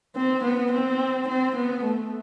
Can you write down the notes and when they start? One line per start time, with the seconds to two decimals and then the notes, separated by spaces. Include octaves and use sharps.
0.16 C4
0.44 B3
0.73 C4
1.29 C4
1.56 B3
1.84 A3